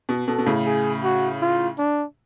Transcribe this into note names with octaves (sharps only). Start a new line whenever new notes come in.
B2
B2 A4
B2
A2 C#3
G#4
F#4
F4
D4